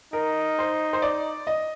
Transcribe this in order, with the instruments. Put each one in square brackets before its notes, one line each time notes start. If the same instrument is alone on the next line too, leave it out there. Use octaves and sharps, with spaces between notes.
[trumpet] D#4 [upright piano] A#4
[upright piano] C5
C5
D5
D#5